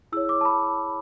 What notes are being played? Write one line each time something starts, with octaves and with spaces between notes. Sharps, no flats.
E4 G#4 C#5 E6
D6
A5
B5